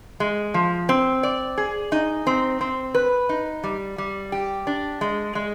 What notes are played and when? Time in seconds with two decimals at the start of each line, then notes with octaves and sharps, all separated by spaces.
0.20 G#3
0.54 F3
0.89 C4
1.23 D5
1.58 G#4
1.92 D#4
2.27 C4
2.61 C4
2.95 B4
3.29 D#4
3.64 G3
3.98 G3
4.32 G4
4.67 D4
5.01 G#3
5.35 G#3